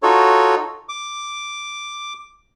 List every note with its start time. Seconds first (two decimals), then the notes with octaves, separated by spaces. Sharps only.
0.03 D#4 F4 F#4 A4 C#5
0.89 D6